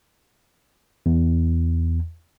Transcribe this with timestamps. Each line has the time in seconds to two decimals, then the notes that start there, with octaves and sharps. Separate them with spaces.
1.06 E2